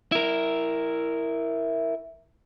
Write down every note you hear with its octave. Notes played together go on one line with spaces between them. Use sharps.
E4 A#4